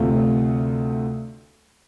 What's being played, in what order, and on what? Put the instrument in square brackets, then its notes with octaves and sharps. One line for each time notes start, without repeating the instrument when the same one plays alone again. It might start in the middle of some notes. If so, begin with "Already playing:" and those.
Already playing: [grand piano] D2 C3 A3 F4